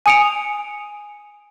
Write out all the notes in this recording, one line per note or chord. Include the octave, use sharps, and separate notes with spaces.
G#5 D#6 C#7 D7 F7